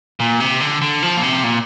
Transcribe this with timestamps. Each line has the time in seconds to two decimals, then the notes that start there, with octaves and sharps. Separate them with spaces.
0.20 A#2
0.40 C3
0.61 D3
0.81 D3
1.02 F3
1.17 A#2
1.23 C3
1.44 A#2